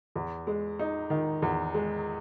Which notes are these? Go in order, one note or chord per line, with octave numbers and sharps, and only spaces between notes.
E2
G#3
D#4
D#3
E2
G#3